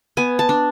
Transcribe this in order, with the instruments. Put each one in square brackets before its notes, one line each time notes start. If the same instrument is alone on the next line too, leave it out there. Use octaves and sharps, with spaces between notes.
[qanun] B3 G#5
A5
D4